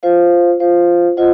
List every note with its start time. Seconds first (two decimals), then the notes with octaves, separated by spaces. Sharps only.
0.03 F4 C5 F5
0.60 F4 C5 F5
1.17 F4 C5 D#5 F#5